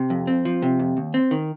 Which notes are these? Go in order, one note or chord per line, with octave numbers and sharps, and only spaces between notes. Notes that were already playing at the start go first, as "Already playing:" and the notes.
Already playing: C3
F2
C4
F3
C3
F2
D#2
C4
D#3